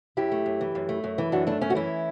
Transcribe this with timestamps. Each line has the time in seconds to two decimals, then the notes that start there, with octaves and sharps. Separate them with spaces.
0.17 F#2 E4 G4
0.32 A3
0.46 F#2
0.61 E3
0.75 F#2
0.89 A3
1.04 F#2
1.18 E3
1.32 F#2 D4 F#4
1.47 A3 D4
1.61 F#2 C#4
1.70 F#4
1.75 E3 C#4 E4